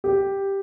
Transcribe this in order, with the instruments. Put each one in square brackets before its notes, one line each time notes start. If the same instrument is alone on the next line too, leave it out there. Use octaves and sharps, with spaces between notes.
[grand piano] G4